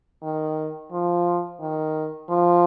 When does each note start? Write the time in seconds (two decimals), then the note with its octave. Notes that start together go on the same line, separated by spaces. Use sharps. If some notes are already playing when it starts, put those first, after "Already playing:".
0.23 D#3
0.92 F3
1.60 D#3
2.29 F3